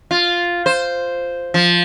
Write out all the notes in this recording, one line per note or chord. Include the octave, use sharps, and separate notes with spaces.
F4
C5
F3